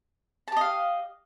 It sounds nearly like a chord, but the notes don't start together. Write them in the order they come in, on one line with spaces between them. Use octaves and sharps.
A5 G4 D#5 F5